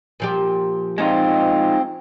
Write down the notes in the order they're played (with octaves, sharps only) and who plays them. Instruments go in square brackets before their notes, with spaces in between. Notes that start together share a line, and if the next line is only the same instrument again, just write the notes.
[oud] A#2 F3 G4
[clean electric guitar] G#3 D#4 F4 [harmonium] C4